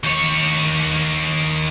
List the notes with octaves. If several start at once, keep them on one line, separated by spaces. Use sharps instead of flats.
D#2 C#5